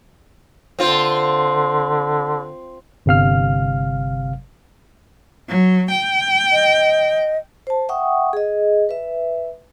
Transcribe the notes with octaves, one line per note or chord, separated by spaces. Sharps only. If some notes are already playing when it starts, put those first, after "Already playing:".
D3 C4 F4 C5
G1 C3 F5 F6
F#3
G5
D#5
C5 A5
E5 F#5 G5 C#6 D#6
G#4 D#5
B4 E5